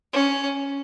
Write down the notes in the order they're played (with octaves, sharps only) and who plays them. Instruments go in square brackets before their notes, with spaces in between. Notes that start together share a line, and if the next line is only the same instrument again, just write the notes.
[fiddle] C#4